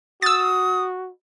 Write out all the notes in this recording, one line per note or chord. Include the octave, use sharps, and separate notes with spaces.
F#4 D#6 E6 A6